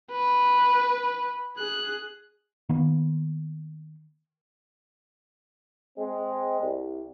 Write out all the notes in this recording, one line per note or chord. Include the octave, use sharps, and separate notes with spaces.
B4
G#4 F#6
D#3 A#3 B3
G#3 C4
C2